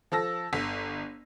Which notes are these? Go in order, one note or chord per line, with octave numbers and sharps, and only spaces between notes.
F3 A4 E6 A#6
G1 B6